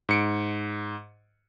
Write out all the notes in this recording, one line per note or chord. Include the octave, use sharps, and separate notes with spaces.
G#2 C#7 D7